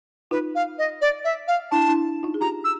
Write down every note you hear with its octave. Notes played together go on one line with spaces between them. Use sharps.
D#4 F4 B4
F5
D#5
D5
E5
F5
D4 E4 A5
D4 E4
D#4 F4
G#4
F4 G4 A#5
E6